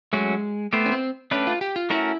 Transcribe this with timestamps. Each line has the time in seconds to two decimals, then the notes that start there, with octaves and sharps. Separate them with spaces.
0.13 F#3 G#3 A3 C#4 F#4
0.73 A3 B3 E4 G4 C5
0.86 C#4
0.92 C4
1.31 A3 C#4 D4 G4 B4
1.47 F4
1.61 G4
1.76 F4
1.90 A3 C#4 E4 F#4 A#4